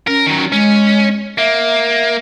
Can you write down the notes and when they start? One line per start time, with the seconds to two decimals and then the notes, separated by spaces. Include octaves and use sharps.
0.07 C#4 A#4
0.27 D#3 F#3
0.52 G#3 C#4
1.38 A#3 E5